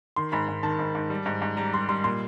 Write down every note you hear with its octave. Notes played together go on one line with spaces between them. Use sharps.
D#3 C6
G#2 B5
G#2
D#3 A5
G#2
G#2
G3
G#2
G#2
G3 A#5
G3 C6
G3 C6
A#2 C6